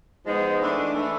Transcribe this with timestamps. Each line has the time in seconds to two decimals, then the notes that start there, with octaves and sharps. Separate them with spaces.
0.26 F3 G#3 B3 D#4
0.60 E3 A3 D4
0.95 E3 A3 D4